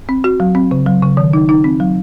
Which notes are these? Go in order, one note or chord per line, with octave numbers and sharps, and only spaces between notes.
C4
F#4
F#3
C4
C#3
F#3
C#3
D#3
D#4
D#4
C4
F#3